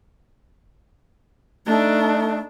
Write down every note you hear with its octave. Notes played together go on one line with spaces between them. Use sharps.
A3 D4 D#4